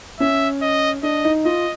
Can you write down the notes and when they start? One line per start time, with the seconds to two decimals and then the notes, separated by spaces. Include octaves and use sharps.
0.20 C#4 E5
0.62 D#5
1.03 D4 D#5
1.24 D#4
1.45 F4 D#5